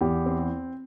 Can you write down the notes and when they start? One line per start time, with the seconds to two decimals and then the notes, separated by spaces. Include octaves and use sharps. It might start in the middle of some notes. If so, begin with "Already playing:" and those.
0.01 E2 G4
0.26 C4